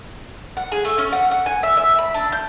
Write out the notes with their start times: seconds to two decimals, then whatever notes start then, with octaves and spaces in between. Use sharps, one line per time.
0.57 F#5
0.72 G#4
0.85 A3
0.98 C#4
1.13 F#5
1.31 F#5
1.46 G#5
1.63 E5
1.77 E5
1.99 B5
2.14 D4
2.32 G6